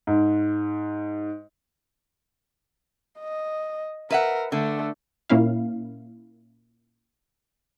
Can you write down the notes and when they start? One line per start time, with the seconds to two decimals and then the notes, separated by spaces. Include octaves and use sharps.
0.07 G#2
3.19 D#5
4.10 A#4 B4 E5 F#5
4.52 D3 A3
5.29 A#2 A#3 C#4 E4 F5